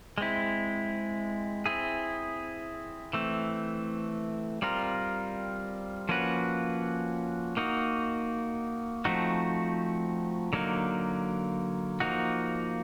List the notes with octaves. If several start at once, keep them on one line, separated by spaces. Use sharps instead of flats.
G#3 C4 E4
C4 E4 G#4
E3 A3 C4
G3 C4 F4 A#4
F3 A#3 C#4 F#4 B4
A#3 D#4 F#4
F3 A3 C4 D#4 F#4
D3 F#3 A#3 D#4
F3 A#3 D#4 F#4